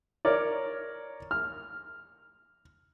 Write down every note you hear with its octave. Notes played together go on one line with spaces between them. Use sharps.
A#4 C#5 D5
F6